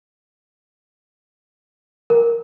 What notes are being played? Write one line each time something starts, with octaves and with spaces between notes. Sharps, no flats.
A#4